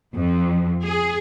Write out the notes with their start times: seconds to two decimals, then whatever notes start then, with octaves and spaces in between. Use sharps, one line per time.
0.16 F2
0.83 G#4